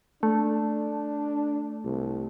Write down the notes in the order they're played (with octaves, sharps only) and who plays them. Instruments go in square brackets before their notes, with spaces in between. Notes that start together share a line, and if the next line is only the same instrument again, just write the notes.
[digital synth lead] A3 [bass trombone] D4
[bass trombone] C2